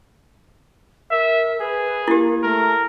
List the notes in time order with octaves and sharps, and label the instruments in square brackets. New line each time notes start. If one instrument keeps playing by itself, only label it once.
[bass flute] A#4 [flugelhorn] E5
[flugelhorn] G#4 [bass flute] B4
[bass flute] A#3 [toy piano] E4 G4
[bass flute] A3 [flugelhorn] A#4